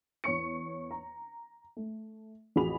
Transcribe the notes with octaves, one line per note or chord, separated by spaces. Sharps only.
E2 C#5 C#6 C#7
A#5
A3
A1 F2 F#4 G#4 B5 F7